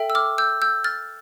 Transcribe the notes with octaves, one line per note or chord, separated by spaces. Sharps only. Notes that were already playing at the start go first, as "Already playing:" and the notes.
Already playing: A4 E5 G5
E6
D6 F6
E6 G6
E6 G6
F6 A6